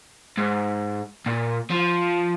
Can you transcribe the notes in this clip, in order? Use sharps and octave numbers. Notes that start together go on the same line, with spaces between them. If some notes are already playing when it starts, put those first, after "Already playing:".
G#2
A#2
F3